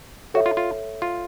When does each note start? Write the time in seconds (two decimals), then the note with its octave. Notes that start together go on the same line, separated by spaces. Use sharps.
0.34 F#4 A4 C#5 E5
0.46 F4
0.57 F4
1.02 F4